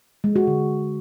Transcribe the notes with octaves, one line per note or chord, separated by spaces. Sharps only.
G#3
F#4
D3